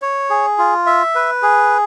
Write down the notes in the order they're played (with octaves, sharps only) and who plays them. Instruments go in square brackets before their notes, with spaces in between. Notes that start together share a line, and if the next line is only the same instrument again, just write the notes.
[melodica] C#5
G#4
F4
E5
B4
G#4